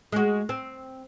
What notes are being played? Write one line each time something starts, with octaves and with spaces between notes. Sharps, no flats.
G#3 F#4
C4